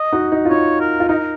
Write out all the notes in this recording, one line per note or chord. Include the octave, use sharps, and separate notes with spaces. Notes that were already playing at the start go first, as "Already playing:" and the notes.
Already playing: D#5
D#4 F#4
D#4
F4
D#4 C#5
A#4
F4
D#4 A#4